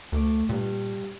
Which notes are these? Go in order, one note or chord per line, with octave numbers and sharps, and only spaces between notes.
D2 A3 D6
G2 A#2